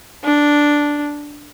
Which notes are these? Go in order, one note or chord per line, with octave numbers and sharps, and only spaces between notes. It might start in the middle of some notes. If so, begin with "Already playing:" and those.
D4